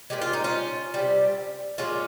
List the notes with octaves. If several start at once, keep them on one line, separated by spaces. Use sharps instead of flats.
A#2 F3 G#3 G4
F4
D#4
C#4 F4
C3 G3
A#2 F3 G#3 C#4 F4